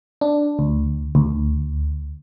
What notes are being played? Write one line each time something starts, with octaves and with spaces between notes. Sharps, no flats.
D4
D2
D2